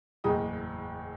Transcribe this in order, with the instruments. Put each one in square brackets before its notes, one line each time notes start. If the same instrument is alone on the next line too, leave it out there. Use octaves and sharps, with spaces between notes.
[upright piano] F#1 E2 A2 D#5 G5 D#6